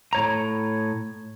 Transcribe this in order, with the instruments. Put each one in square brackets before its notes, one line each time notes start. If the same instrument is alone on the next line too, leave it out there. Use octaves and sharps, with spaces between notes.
[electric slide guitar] A2 C#5 A#5